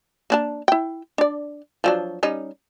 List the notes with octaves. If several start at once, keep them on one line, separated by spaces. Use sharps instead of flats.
A#3 D4 A5
E4 G5
D4 D5
F3 F#3 D4
G3 C#4 D#4